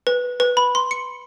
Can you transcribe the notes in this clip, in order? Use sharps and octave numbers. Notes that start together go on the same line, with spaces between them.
B4
B4
B5
C6
C#7